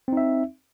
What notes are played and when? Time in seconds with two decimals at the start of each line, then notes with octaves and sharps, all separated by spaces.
0.08 C4
0.13 D#4
0.17 E5